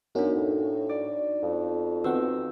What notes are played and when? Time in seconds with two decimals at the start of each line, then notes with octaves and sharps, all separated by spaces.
0.15 F#2 B3 D4 D#4 F#4
0.36 A2
0.89 D5
1.43 F2
2.04 D#3 B3 C4 F#4 B4 F#5 E6